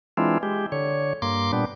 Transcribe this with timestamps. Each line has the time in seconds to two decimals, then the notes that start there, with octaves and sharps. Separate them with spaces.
0.17 E3 G#3 C4 D4 E4 F4
0.43 G#3 G4
0.72 D3 C#5
1.22 G2 A#3 C6 D6
1.53 A#2 G3 B3 D4